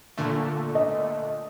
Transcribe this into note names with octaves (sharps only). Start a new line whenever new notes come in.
A#2 D3 A3
D#5